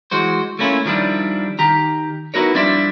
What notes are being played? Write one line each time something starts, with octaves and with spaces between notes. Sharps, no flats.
E3 G#3 F#4 C5
A3 A#3 C#4 E4 F4
D#3 F3 G3 D4 E4
D#3 G4 A#5
B3 D#4 E4 F#4 A#4 C#5
F3 G3 C4 D4 E4 E5